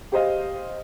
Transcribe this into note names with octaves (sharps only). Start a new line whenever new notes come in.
G4 C5 D#5 F5